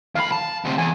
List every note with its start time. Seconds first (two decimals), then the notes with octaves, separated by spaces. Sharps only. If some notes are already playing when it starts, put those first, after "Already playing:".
0.15 D#2 F5 B5
0.32 A5
0.65 D2 C3
0.78 E2 G#5